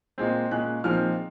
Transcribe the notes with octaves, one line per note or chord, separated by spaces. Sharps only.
A#2 G#3 C4
A#2 G#3 C#4 F#6
A#2 F3 G#3 C4 D#4 F6